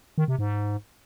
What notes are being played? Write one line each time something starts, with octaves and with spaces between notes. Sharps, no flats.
D#3
C3
G#2